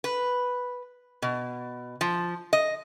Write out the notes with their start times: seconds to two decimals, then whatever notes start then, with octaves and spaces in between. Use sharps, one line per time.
0.04 B4
1.22 B2
2.01 F3
2.53 D#5